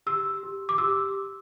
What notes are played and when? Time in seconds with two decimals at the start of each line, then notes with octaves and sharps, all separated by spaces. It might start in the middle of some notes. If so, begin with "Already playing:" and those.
0.06 G4 E6
0.43 G4
0.69 D6
0.78 G4 E6